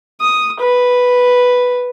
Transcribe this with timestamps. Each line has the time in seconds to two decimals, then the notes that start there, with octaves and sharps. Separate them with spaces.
0.21 D#6
0.60 B4